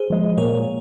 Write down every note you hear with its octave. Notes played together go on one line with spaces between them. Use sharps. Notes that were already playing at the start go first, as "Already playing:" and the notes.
Already playing: G#4 C5
F3 G#3
A#2 A#4 C#5